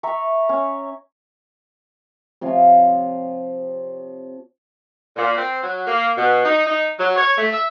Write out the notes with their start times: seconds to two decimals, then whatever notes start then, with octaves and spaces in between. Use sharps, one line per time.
0.03 E5 A#5 C#6
0.49 C#4
2.41 C3 F3 C#5 C6
5.16 A#2
5.37 C4
5.62 F#3
5.87 A#3
6.17 B2
6.44 D#4
6.64 D#4
6.99 F#3
7.16 C#5
7.37 A3
7.52 E5